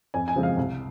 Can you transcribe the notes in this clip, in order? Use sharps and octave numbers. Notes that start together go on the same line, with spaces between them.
F2 G#5
G#5
C#3 F3 G#3 C4
F5
C2